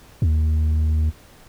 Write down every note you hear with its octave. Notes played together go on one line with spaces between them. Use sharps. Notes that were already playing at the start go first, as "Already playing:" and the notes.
D#2